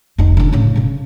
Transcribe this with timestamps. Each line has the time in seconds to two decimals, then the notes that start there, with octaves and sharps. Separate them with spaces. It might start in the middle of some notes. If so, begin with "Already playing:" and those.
0.18 F1 D#4
0.37 D3 C#4
0.53 A2 C#3
0.76 C#3 C#4